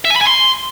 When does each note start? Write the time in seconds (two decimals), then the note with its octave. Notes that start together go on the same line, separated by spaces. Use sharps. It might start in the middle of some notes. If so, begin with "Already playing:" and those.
0.05 E5
0.10 G#5
0.16 B5
0.21 G#5
0.27 C6